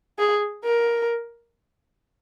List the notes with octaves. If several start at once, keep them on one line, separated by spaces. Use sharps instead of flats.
G#4
A#4